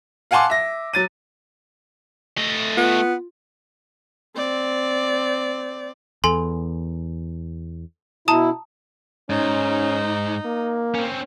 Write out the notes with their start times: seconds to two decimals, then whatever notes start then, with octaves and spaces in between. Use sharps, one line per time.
0.31 F5 F#5 G#5 A5 C6 D6
0.50 E5 A#6
0.93 F#3 A6 D#7
2.38 A3 D#5 A6
2.77 B3 F4
4.36 C4 D5
6.24 E2 A4 G#5 C6
8.28 B2 E4 A5 A#5 D#6
9.30 G#2 C#4 D#4
10.45 A#3
10.95 C4 C#4